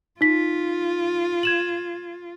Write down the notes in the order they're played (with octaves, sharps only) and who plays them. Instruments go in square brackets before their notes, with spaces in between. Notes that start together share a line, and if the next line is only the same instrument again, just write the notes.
[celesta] D#4 B6 [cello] F4
[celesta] G#6 E7 F#7